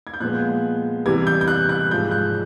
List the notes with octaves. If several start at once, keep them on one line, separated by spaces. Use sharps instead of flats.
G#6
G6
A#2 F3 G#3 B3 F#6
C3 E3 G3 G#6
G6
G6
F#6
F#6
G#2 F3 G#3 G6
F#6